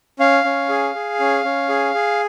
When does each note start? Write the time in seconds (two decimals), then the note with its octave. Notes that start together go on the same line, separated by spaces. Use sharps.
0.19 C#4 F5
0.44 C#4
0.69 G#4
0.94 G#4
1.20 C#4
1.44 C#4
1.69 G#4
1.94 G#4